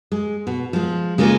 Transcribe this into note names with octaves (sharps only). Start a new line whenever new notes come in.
G#3
B2
F3 G#3
C#3 G#3 A#3 F4 G#4